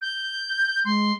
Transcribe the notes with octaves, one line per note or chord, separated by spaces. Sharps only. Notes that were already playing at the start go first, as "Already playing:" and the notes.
G6
G#3 C6